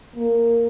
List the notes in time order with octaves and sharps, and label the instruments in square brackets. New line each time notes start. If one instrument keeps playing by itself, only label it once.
[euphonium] A#3